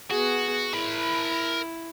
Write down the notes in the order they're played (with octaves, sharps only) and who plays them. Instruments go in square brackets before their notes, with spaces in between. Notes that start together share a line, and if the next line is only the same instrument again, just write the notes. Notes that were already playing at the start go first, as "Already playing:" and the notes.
[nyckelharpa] B3 G#4 [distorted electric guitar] F#4
[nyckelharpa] E4 [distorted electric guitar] A#4 B5